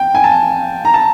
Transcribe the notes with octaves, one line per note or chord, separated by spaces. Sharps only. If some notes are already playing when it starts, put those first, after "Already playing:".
Already playing: G5
G#5
A5
A#5
A5